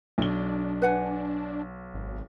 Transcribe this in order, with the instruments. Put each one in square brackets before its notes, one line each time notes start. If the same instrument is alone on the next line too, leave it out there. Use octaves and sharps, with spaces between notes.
[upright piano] B1 G7 [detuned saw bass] D4
[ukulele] B4 F#5 G#5
[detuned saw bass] G#1